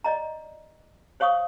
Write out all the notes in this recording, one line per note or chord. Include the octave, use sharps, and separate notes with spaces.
D5 D#5 A#5
C5 C#5 F5 C#6 D#6